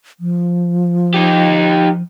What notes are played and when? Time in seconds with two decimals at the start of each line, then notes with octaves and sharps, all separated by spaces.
0.20 F3
1.14 D#4 G4